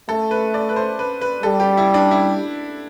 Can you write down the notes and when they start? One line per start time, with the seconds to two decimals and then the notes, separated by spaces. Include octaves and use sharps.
0.09 A3 A4
0.31 B4
0.54 D5
0.69 B4
0.76 C5
0.99 B4
1.21 B4
1.43 G3 A4
1.60 G4
1.77 E4
1.94 D4
2.11 E4